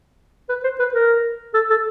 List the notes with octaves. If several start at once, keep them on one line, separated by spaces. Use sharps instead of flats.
B4
C5
B4
A#4
A4
A4